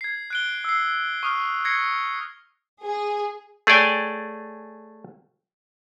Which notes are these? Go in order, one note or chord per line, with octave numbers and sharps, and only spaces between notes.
G#6 C7
F#6 D7 G7
E6 C7
C#6 D#6 F6
G#6 A#6 C7 C#7
G#4
A3 G#4 C#5 D5 G5 G#5